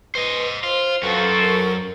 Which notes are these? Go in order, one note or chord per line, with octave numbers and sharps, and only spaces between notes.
B4 C5 D#5
F4 C5
F#2 F3 C4 F#4 A4 B4
A#4